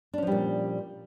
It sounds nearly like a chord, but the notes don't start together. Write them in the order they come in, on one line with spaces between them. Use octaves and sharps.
D4 C#4 F3 G3 A#2